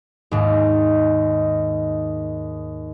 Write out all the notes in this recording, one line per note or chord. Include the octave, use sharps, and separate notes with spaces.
D#2 G#2